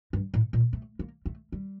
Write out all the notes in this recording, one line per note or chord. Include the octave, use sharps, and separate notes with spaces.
G2
A2
A#2
A3
A#3
A3
G3